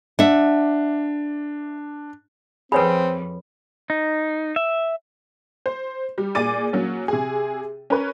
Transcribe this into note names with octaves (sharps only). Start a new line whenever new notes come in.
D4 E5 F#5
F2 C4 G#4 B4 C#5 B5
D#4
E5
C5
G3
A#2 G#4 D5 D6 A6 D#7
F#3 A#3 C#4
C3 G#4
C#4 A#4 B4 C#5